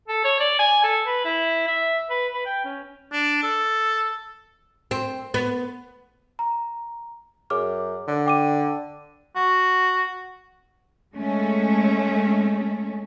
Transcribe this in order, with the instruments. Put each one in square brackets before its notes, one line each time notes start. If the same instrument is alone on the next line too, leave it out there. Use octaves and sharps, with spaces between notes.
[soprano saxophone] A4
C#5
D5
G#5
A4
B4
E4
E5
B4
B4
G5
C#4
[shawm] D4
A4
[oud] C4
B3
[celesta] A#5
[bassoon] F#2 [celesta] G#4 D6 F6
[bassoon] D3
[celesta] G5 D6 D#7
[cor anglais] F#4
[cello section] G#3 A3 C#4